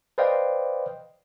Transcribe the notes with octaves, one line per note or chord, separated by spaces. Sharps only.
B4 C5 D5 D#5 F5 G5